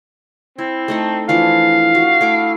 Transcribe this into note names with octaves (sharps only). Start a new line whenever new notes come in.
C4 E4
A3 D#4 A4
E3 F3 D4 F5
F#4
A3 E4 D6